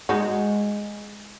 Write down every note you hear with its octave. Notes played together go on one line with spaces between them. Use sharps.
G#3 D#4 F#4